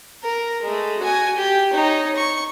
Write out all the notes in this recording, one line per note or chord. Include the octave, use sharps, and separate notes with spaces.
A#4
G#3 A3
F#4 G#5
G4
D#4 C#5
C#6